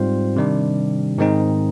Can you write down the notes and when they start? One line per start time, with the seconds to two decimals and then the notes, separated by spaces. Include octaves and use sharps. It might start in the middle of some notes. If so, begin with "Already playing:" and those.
Already playing: G#2 G3 C4 F4 C5
0.36 C3 D#3 G3 D4
1.18 G#2 D#3 G#3 C4 D#4